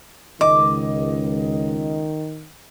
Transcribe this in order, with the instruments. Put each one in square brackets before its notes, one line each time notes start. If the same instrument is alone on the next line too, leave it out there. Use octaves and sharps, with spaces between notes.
[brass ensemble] C#2 [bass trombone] D#3 [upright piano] D#5 [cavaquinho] D6